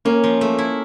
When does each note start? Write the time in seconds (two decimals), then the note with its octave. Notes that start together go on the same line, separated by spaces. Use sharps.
0.05 A#3 C#4
0.24 F3
0.41 A3
0.58 E4